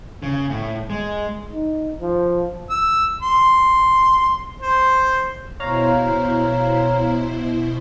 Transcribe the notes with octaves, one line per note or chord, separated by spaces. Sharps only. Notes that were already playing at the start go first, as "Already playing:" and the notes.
C#3
A2
G#3
D#4
F3
E6
C6
C5
B2 E4 C5 C#5 F5 A#5